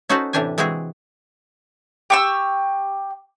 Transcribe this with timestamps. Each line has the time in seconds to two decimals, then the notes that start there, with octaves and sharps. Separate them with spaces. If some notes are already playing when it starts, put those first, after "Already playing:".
0.09 C#4 D#4 F#4 A4 B4 C5
0.33 A2 C3 E3 D4 G4 G#5
0.58 E3 G#3 C4 F#4 G#4
2.10 G4 C#6 E6